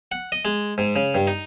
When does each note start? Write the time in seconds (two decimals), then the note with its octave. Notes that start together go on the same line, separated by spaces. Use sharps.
0.12 F#5
0.32 D#5
0.45 G#3
0.78 G#2
0.96 C#3
1.15 G2
1.27 D#4